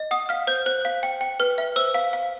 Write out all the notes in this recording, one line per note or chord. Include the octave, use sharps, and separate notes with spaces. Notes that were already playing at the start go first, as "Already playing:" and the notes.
Already playing: D#5
F#5 D#6
F5 F6
C5 G6
C5 F#6
F5
G5
G5
B4 F6
E5
C5 E6
F5
F5